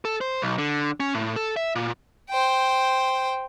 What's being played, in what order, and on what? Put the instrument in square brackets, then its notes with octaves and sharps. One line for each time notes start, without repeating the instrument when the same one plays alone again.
[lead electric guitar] A4
C5
B1
D3
C#4
A2
A4
E5
A#2
[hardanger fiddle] C5 G5